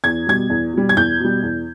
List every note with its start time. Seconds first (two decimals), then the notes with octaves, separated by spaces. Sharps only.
0.04 E2 G#6
0.27 B2 G3 G#6
0.50 E2
0.73 B2 G3
0.89 G#6
0.97 E2 G6
1.20 B2 G3
1.43 E2